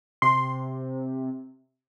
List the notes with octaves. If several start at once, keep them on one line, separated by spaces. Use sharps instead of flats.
C3 C6